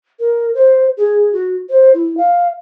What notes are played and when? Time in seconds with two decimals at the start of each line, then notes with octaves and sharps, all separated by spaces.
0.20 A#4
0.54 C5
0.97 G#4
1.33 F#4
1.69 C5
1.94 E4
2.17 F5